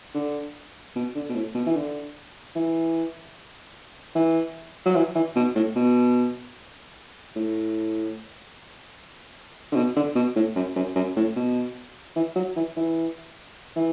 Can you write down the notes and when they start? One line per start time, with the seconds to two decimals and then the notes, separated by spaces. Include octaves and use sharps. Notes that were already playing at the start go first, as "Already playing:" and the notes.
0.14 D3
0.96 B2
1.15 D3
1.29 B2
1.36 A2
1.55 B2
1.66 E3
1.76 D3
2.55 E3
4.15 E3
4.86 F#3
4.96 E3
5.15 E3
5.36 B2
5.56 A2
5.76 B2
7.36 A2
9.72 D3
9.76 B2
9.96 D3
10.15 B2
10.36 A2
10.56 F#2
10.76 F#2
10.95 F#2
11.16 A2
11.36 B2
12.16 E3
12.36 F#3
12.56 E3
12.77 E3
13.76 E3